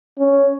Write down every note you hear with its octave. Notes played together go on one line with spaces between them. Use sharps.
C#4